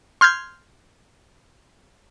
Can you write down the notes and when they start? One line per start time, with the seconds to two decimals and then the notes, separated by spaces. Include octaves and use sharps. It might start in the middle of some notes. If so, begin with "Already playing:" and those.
0.21 C6 F6 G6 G#6